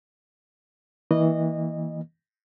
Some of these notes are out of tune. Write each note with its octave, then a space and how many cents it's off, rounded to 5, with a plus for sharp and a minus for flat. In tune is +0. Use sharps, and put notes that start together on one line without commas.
E3 -25 A#3 +0 D#5 -20